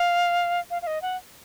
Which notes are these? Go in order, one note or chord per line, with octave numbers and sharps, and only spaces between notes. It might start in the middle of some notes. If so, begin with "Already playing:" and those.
Already playing: F5
F5
F5
D#5
F#5